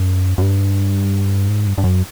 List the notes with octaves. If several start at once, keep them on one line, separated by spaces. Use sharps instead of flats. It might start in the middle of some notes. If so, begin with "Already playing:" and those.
Already playing: F#2
F#2
G2
G#2
G2
G2
F#2